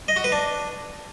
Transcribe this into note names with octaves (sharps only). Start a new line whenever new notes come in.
D#5
F#4
B4
D4